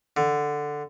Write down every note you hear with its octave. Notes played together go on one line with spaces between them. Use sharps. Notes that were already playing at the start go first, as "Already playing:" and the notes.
D3